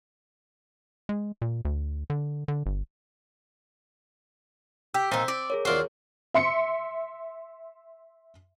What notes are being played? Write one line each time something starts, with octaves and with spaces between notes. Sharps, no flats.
G#3
A#2
D2
D3
D3
G1
G4 E6 G6 B6
A#2 C4 D#4
D5
G#4 A#4 C#5
D#2 F4 F#4 C5 D5
E5 C6 C#7